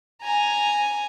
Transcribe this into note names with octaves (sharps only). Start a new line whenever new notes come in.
G#5 A#5